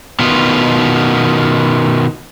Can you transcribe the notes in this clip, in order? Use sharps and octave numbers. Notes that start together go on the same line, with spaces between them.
B2 D#3 B3 F4